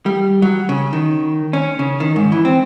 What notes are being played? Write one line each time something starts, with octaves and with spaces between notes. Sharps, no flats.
G3
F#3
C#3
D#3
C#4
C#3
D#3
G#2
E3
C4